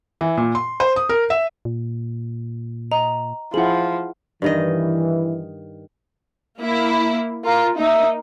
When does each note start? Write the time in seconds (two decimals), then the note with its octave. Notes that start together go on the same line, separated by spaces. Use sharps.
0.21 E3
0.37 A#2
0.55 C6
0.80 C5
0.96 D#6
1.09 A#4
1.30 E5
1.65 A#2
2.92 D#5 A#5
3.54 F3 E4 G#4 F#5 F#7
4.42 G2 D#3 E3 D#5
6.60 A#3 E4
7.45 F4 A#4
7.78 A#3 D#4 E5